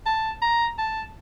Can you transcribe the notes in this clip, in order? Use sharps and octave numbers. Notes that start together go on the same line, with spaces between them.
A5
A#5
A5